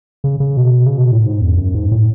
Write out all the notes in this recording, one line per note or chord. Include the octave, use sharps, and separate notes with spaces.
C#3
C#3
B2
C#3
B2
A2
G#2
E2
F#2
G#2
A2